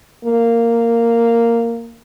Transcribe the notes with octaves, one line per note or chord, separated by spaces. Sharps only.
A#3